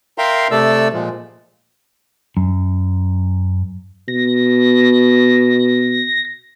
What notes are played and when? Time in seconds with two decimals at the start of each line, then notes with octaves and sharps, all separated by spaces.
0.18 A#4 E5 F5 G5 A#5 C6
0.51 C3 A3 A4 D5 E6
0.93 A#2 F3 G#3
2.37 F#2
4.08 B2 A#6